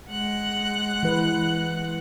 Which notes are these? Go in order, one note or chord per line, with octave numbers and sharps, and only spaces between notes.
G#3 F#5 F#6
E3 B4